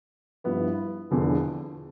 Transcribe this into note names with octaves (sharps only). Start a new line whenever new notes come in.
G2 F3 B3 E4 B4
E1 E2 D3 F3